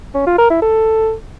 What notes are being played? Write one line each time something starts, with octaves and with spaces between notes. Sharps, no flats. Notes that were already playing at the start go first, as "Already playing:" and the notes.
C#4
F4
A#4
E4
A4